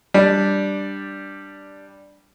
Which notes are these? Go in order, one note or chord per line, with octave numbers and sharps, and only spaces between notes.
G3 D4